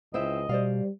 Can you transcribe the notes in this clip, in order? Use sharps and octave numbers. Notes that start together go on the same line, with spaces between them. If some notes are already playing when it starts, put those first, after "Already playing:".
C#2 C4 E4 D#5 E5
B2 G3 C5 D5 F5